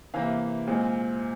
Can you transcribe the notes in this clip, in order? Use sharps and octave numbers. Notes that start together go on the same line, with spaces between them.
C3 E3 A#3 F5
A#2 G#3 C4